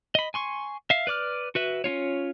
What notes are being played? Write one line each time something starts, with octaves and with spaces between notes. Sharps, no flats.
D#5 B5
G#5 C6 C#6
E5 F5
B4 D5 D6 F6
F#4 B4 E5
C#4 D4 F4 C#5